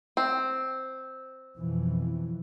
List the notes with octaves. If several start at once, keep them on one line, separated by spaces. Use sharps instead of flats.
C4
F2 B2 E3